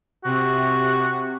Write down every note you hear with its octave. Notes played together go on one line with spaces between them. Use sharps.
C3 F#4